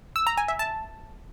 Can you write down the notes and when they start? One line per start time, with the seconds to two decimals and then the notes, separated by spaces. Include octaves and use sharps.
0.16 E6
0.27 A#5
0.37 G#5
0.48 E5
0.59 A5